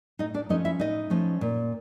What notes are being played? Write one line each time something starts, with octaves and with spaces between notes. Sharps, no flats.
A2 D#4 D#5
D4 D5
F3 A3 C#4 D#4 D#5
E4 E5
A2 D#4 D#5
F3 A3 C#4
A#2